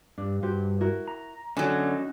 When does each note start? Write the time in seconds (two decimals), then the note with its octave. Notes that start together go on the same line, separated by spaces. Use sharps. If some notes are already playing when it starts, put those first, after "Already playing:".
0.18 G2 D4
0.43 G2 F#4 G4 C5
0.81 E4 F#4 A#4
1.08 A#5
1.57 D3 F#3 C#4 D#4 F#4 G#5